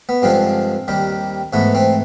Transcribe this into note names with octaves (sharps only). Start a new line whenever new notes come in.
B3
G2 D3 F3 G#3 C4
D#2 D#3 G3
G#2 E3 A3 B3
C4